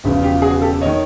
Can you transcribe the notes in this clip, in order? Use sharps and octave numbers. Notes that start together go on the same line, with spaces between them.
E1 E2 C#3 F3
F4 G4
F#4 G#4
G4 A4
D#3 C#5 D#5